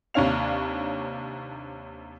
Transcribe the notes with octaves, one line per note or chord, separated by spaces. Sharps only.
D#2 C3 D4 C#5 F5 F7